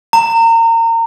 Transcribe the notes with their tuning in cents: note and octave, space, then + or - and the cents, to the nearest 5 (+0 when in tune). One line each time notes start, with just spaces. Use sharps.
A#5 -30